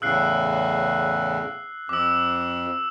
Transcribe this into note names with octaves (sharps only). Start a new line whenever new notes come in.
E2 A2 C#3 E6 F#6 C7
F2 D6 E6